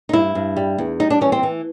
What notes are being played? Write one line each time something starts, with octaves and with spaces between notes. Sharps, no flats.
D#4
G2 E4
G2
G3
E2
G3 D#4
D4
E3 C#4
C4
E3